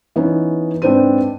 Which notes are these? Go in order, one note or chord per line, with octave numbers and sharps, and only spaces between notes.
E3 B3 C#4 D#4 E4
G#2 C4 D4 B4 C5 D#7